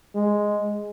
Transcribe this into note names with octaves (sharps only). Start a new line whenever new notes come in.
G#3